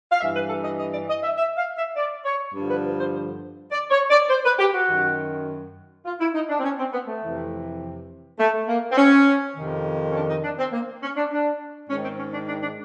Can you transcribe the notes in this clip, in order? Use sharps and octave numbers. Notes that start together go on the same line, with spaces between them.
F5
G2 E3 E5
B4
A4
D#5
D#5
D5
D#5
E5
E5
F5
E5
D5
C#5
G2 D3 F3
B4
C5
D5
C#5
D5
C5
B4
G4
F#4
F#2 D#3
F4
E4
D#4
D4
C4
C#4
C4
B3
A3
F2 C3 E3
A3
A#3
C4
C#4
F2 C3 D#3
C#4
D4
D#4
D4
C4
A#3
C#4
D4
D4
G#2 D#3 C#4
C4
C#4
D4
D4
D4